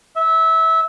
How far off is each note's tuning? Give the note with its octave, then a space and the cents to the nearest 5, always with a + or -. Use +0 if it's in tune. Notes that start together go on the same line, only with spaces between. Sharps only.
E5 -20